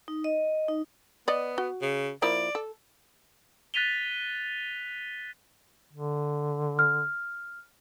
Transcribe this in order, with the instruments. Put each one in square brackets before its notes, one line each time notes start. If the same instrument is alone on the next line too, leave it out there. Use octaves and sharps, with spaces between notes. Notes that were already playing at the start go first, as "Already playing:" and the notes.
[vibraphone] D#4
D#5
D#4
[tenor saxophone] B3 [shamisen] D5 D#5
[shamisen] F#4
[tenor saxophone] C#3
[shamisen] F3 A#3 E4 [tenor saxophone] D5
[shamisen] A4
[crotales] F#6 A6 B6 D#7 F7 G7
[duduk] D3
[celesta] F6